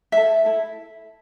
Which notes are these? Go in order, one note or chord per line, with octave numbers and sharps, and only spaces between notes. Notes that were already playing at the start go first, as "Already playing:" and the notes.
E4 A4 E5
E4 A4